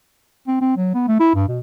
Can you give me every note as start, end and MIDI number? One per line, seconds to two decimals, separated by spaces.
0.48 0.57 60
0.61 0.76 60
0.77 0.90 54
0.94 1.06 59
1.08 1.17 57
1.20 1.30 64
1.35 1.46 43
1.48 1.60 47